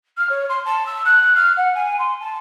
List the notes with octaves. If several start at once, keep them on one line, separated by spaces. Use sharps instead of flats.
F6
C#5
C6
A5
E6
F#6
F6
F#5
G#5
C6
A5